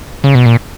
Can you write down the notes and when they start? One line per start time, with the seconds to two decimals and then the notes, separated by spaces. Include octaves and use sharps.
0.24 C#3
0.35 B2
0.46 A#2